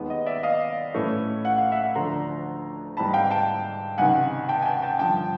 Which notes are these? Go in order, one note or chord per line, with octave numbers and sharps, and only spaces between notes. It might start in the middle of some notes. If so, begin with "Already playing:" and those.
Already playing: D#2 D#3 G#3 B3
D#5
D5 E5
D#5 F5
A2 E3 A3 C#4
F#5
F5
E5 F#5
D2 D3 F3 A3 D4 A#5 C6
G#2 E3 G3 C4 A5 B5
F5 G5
G5 A5
C#2 C3 D#3 F#5 G#5
G5 A5
G#5
G5 A5
G5 A5
G2 D3 F3 G5 A5